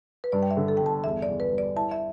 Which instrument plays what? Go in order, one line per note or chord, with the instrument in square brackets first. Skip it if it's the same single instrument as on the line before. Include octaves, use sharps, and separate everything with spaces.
[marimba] B4
[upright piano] G2 [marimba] D5
[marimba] G5
E5
[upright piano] D3
[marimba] A4
[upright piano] G1 [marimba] G5
[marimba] A5
[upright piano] E2 [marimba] E5
[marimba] D5
[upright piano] E2
[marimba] B4
[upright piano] G3
[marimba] D5
[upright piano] E4 [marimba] A5
[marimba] E5